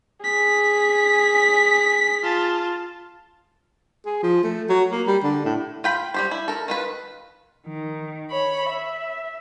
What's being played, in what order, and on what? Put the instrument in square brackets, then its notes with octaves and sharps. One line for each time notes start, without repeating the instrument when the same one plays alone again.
[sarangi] G#4 [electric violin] B6
[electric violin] F4 A5
[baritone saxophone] G#4
F3
A3
F#3
A#3
G3
D3
A2
[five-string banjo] F4 G5 B5
G3 G4 C5
E4
A4 A#4
D#3 F4 B4
[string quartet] D#3
C#5 B5
E5